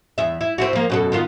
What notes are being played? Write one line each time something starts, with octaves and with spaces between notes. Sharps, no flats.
E2 E5
E4
C4 E4 F#4
F3 A#3
F#2 B2 A4
D#3 B3 F4